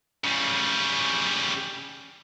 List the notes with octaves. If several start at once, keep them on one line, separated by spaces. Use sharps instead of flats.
C#3 G3